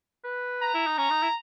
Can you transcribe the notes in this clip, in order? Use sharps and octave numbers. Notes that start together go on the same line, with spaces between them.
B4
A#5
E4
D#4
C#4 A#5
D#4
E4